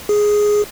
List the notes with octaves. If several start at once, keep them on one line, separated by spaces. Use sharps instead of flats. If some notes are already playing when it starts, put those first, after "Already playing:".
G#4